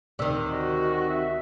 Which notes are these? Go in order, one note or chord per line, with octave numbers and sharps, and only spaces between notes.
D2 C3 D#3 D5 E6
F#4 D#5
E5